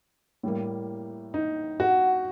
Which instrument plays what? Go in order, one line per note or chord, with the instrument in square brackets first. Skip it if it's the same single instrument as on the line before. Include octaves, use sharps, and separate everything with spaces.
[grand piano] A2 G3 A#3
D#4
F#4